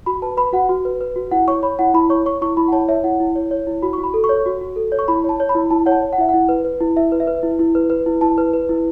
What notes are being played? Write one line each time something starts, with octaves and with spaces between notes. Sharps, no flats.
F#4 B5
B4 A5
B4 B5
F#4 F#5
F#4
B4
B4
F#4
E4 F#5
C#5 C#6
C#5 B5
E4 F#5
E4 B5
C#5 C#6
C#5 C#6
E4 C#6
E4 B5
F#5
C#5 A5
C#5 E5
E4 F#5
E4
C#5
C#5
E4
F#4 B5
C#6
F#4
B5
A4
C#6
C#5
F#4
F#4
A4
C#5
C#6
E4 B5
C#5 A5
C#5
B5
E4
E4 A5
C#5 F#5
A5
C#5
F#5
E4 E5
E4 F#5
B4
B4
E4
E4 E5
B4
E5
B4
E4
E4
B4
B4
E4
E4 A5
B4
B4
E4